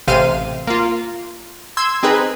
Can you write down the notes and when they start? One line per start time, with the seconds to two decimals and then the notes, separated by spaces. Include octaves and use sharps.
0.08 A1 C3 C5 F5 D#7
0.67 A#3 F4
1.77 C6 E6 G#6
2.03 C4 D#4 G#4 B4